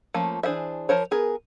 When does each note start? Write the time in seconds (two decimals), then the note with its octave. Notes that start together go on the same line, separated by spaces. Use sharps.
0.14 F3 A3 A#3 C#4
0.43 E3 D4 G#4 C5 E5
0.89 F3 A#4 C5 C#5
1.11 B3 G#4 A#4